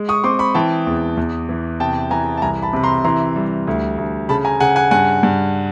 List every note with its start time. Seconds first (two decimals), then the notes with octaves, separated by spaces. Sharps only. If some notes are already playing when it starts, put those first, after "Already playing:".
Already playing: G#3
0.09 C#6 D#6
0.24 C4 C6 D6
0.39 B5 C#6
0.55 E3 G5 A5
0.87 E2
1.17 E2
1.49 E3
1.80 C3 G5 A5
2.10 E3 G#5 A#5
2.37 A5
2.42 C2 G#5 A#5
2.62 A5 B5
2.73 C3 B5
2.83 A#5 C6
3.04 E3 A#5 C6
3.36 G3
3.67 D2
3.98 D2
4.29 C#3 A5 B5
4.45 G#5 A#5
4.60 C#3 F#5 G#5
4.76 F#5 G#5
4.91 G2 F#5 G#5
5.23 G2